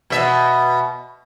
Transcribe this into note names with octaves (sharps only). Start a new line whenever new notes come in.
B2 E5